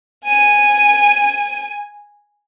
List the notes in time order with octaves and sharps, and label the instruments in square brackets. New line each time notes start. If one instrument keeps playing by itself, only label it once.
[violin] G#5 D#7